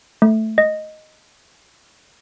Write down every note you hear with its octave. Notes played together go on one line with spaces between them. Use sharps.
A3
D#5